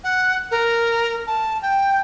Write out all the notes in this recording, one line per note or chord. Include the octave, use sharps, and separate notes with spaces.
F#5
A#4
A5
G5